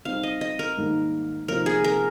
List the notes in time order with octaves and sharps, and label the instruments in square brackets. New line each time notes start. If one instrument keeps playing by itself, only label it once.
[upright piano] G3 C4 D#4 [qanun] F5
[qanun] D#5
D#5
A#4
[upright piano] G#2 D#3 G3 A#3
[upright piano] C3 F3 A#3 D#4 [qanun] A#4
[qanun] G#4
A#4